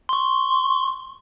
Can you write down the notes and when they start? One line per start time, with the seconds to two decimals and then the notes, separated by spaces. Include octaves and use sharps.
0.09 C6 C#6